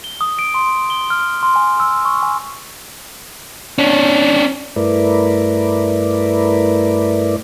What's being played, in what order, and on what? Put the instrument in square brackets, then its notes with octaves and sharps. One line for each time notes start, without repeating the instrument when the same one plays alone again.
[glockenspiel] G7
D#6
D7
C6
G7
F6
C6
G#5
E6
C#6
G#5
[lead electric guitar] C#4 D4
[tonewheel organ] G2 A3 E4 A#4 B4 D5